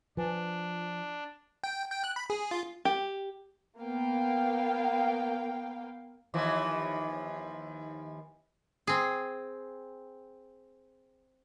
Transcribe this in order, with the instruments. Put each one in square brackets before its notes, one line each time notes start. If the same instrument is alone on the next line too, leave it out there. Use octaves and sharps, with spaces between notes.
[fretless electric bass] F3 [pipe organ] D4 [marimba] B4 G#5
[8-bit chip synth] G5
G5
F#6
B5
G#4
F4
[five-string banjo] G4
[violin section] A#3 B3 F5 G5
[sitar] D#2 E3 F3
[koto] C4 G#4